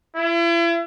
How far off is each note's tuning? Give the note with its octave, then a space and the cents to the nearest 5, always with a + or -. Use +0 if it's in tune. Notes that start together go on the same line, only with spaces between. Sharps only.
E4 +40